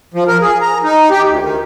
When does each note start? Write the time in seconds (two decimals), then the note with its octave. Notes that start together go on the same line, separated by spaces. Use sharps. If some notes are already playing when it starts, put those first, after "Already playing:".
0.14 F3
0.28 A#4
0.41 G#4
0.61 A#5
0.83 D#4
1.11 G4
1.29 D2
1.42 D#3